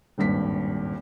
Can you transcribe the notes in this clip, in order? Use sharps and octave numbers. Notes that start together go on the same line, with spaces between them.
D#1 G#1 G2 B6